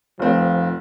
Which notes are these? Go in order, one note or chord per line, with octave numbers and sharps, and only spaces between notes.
F1 F3 C4